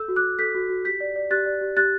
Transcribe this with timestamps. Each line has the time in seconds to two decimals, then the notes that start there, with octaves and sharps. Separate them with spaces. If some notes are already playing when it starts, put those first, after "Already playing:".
Already playing: A4 E6 G6
0.08 F#4
0.16 D6 F#6
0.24 F#4
0.39 A4 G6 B6
0.55 F#4
0.69 F#4
0.85 G4 G6 B6
1.00 D5
1.16 D5
1.31 G4 F#6 A6
1.46 D5
1.61 G4
1.77 G4 F#6 A6